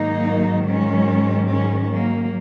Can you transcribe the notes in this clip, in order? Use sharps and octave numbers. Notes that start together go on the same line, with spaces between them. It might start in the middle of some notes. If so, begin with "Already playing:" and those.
Already playing: G#2 D#3 F#3 A#3 D#4
G#3 C#4
G#3 C#4
F#3 A#3